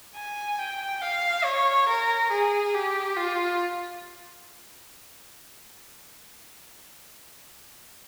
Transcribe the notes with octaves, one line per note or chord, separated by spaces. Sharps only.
G#5
G5
F5
C#5
A#4
G#4
G4
F4